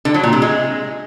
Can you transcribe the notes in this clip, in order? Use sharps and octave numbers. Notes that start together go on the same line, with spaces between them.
D3
F#3
A#2
C3
G#3